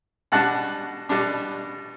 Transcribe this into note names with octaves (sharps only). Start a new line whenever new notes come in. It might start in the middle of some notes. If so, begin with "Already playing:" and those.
B2 G3 D4 F#5 A5
B2 G3 D4